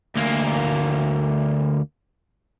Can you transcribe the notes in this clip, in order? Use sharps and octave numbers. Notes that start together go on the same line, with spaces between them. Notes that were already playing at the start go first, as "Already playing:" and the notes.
D2 A#3